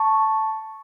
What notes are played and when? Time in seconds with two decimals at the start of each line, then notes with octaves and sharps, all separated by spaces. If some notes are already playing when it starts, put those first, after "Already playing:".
Already playing: A5 C#6